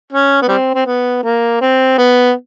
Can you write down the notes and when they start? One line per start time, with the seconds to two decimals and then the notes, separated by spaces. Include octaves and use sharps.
0.12 C#4
0.42 B3
0.48 G3 C4
0.74 C4
0.86 B3
1.23 A#3
1.61 C4
1.98 B3